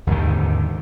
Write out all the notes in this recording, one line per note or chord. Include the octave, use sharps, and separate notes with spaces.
D#2 G#2 D3 D#3